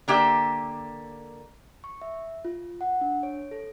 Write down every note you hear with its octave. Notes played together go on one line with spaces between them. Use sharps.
D3 A#3 G4 E5
C#6
E5
F4
F#5
D4
C#5
A4